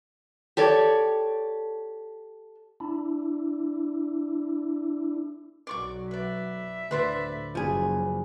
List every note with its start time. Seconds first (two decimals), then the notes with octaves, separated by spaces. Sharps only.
0.57 G4 A4 C#5 D5
2.80 D4 E4
5.67 B1 F#3 D5 C#6 D6
6.11 B4 D5 E5
6.91 D2 A2 B4 C5 D5
7.55 F#1 F3 G#4